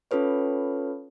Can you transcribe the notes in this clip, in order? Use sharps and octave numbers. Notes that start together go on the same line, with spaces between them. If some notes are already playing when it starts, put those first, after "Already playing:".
C#4 F4 A4 B4 C#5